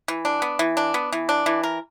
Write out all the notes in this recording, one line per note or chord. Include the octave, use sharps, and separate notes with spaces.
E3
D4
B3
E3
D4
B3
E3
D4
E3
A#4